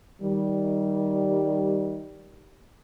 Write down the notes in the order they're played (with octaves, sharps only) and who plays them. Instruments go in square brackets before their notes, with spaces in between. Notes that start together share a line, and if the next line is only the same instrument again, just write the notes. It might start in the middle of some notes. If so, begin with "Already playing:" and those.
[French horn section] D#3 G3